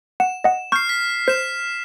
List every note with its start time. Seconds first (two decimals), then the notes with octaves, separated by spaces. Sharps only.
0.20 F#5 E7
0.44 D#5 F#5
0.72 C#6 F6 G6 C7
0.89 B6
1.28 C5 C7 E7